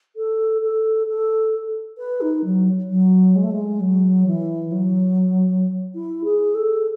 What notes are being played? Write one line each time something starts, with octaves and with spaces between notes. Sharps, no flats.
A4
A4
A4
B4
D#4
F#3
F#3
G#3
A3
G#3
F#3
E3
F#3
E4
G#4
A4